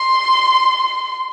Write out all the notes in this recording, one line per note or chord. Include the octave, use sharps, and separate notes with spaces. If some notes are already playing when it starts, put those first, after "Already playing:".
Already playing: C6